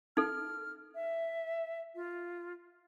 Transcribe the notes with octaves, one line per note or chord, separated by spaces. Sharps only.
D#4 A4 F6
E5
F4